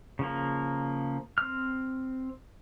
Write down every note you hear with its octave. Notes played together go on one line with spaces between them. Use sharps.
C#3 F3 A#3
C4 F6